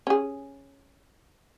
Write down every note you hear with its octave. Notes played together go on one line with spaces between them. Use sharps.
C#4 G#4